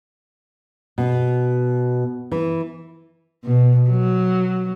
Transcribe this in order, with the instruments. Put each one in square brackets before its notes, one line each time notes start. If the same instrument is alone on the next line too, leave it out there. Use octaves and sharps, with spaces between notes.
[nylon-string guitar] B2
E3
[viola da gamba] B2
F#3